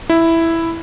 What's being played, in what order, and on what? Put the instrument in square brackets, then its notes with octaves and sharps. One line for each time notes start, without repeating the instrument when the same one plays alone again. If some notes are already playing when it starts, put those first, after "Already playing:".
[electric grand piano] E4